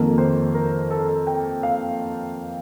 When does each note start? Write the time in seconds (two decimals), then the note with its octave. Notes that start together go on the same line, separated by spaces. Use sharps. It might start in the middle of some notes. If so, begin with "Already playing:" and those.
Already playing: F2 D#3 A#3 A4
0.18 C5
0.55 A#4
0.91 A4
1.27 G5
1.63 F5